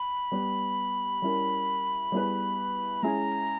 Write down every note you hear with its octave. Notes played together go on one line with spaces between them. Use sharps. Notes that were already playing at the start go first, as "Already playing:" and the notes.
Already playing: B5
G3 B3 G4
G3 C#4 E4 A#4
G3 B3 E4 G#4 B4
G#3 C#4 E4 G#4 A#5